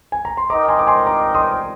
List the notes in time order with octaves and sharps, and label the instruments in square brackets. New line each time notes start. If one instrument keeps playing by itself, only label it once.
[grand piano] G#5
A#5
C6
[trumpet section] D#4 A#4 D#5 G5 [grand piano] A#5 D6
[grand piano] G#5 C6
D6
G#5 C6
A#5 D6
C6 D#6